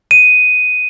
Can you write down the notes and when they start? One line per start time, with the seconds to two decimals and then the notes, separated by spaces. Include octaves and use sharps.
0.11 D#7